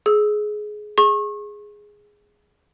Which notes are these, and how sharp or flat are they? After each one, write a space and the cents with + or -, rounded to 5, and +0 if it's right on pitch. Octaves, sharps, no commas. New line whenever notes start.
G#4 +15 E6 +0
G#4 +0 C#6 -35